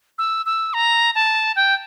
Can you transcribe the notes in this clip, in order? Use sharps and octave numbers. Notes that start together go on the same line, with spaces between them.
E6
E6
A#5
A5
G5